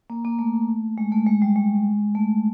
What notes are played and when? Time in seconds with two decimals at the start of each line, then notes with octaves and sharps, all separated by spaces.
0.10 A#3
0.25 A#3
0.39 A3
0.98 G#3
1.12 A3
1.27 G#3
1.42 G3
1.56 G#3
2.15 A3